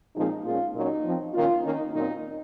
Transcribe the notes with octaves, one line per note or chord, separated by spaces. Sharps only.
A#2 F3 G#3 C4 D#4
A#2 G#3 C#4 F4
A#2 F#3 C#4 D#4
F3 C4
D#3 A#3 C#4 F4
D#3 A#3 C#4 D#4
A#2 F#3 C4 D#4